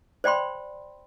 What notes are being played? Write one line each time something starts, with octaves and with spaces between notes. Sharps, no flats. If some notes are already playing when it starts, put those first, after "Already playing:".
C5 D5 G5 B5 C6